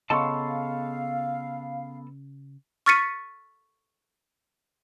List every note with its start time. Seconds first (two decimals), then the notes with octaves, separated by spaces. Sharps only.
0.10 C#3 B3 A4 D#5 F5 A5 C6 C#6
2.86 C#6 F6 A6 B6 C#7 D#7